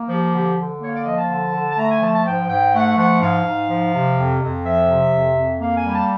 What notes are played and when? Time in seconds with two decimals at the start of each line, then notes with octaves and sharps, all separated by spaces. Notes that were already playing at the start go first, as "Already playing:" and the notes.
Already playing: A#3
0.09 F3 G4
0.33 D3 G4
0.57 D3
0.80 A#3 C#5
0.93 D5
1.05 F3 D#5
1.16 A5
1.28 D3
1.52 D3
1.69 A5
1.77 A3 A#5
1.89 G#5
2.00 F3 A5
2.12 A5
2.24 G#2 G5
2.48 G#2 G5
2.72 A3 F#5
2.96 F3 F#5
3.20 G#2 F5
3.44 G#2
3.69 F3
3.92 C3
4.15 F2
4.40 F2
4.64 F3 E5
4.88 C3
5.11 F2
5.35 F2
5.60 A#3 F5
5.76 G#5
5.84 G3
5.92 A5